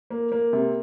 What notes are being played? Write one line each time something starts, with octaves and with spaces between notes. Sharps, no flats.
A#3
A#3
C3